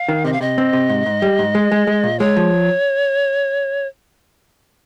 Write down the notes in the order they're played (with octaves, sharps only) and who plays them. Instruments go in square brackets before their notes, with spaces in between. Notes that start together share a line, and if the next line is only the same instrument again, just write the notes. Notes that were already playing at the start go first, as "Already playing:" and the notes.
Already playing: [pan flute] F5
[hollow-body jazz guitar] D#3
[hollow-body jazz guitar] C3 [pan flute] D#5
[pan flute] F5
[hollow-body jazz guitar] C3 [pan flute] D#5
[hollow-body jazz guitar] C4
C3
G#2
G#2
G3
G#2
G#3
G#3
G#3
A#2
[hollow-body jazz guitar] G#3 [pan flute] C#5
[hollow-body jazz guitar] F3